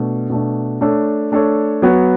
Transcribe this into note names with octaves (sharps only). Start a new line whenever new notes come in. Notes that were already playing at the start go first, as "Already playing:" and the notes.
Already playing: B2 A3 D4
B2 A3 D4
A3 D4 A4 C#5
A3 D4 A4 C#5
F#3 B3 F#4 C#5